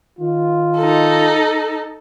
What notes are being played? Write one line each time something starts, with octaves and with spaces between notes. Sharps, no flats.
D#3 F4
D#4 A4